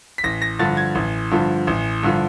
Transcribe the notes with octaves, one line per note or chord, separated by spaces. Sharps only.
B6
A1 A#6
A#6
G2 D3 F3 A6
G#6
A1
G2 D3 F3
A1
G2 D3 F3